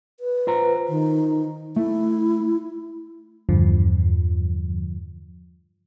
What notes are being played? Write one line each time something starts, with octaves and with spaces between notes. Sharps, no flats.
B4
F4 C5 A#5
D#3
A3 E4
E2 G2 D3 F3